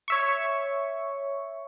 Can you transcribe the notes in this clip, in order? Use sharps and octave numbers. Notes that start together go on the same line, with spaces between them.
C#5 E5 C#6